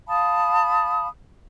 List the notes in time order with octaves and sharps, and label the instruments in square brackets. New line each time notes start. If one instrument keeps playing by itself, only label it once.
[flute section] F5 A5 B5 D#6